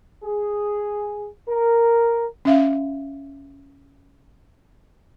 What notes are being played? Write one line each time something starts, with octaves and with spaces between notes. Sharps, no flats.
G#4
A#4
C#4 E5 F5